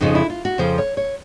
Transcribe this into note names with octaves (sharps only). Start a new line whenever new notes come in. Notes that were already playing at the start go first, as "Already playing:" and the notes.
F2 C#3 F3 D#4
E4
F4
F#4
F2 C#3 F3 C5
C#5
C#5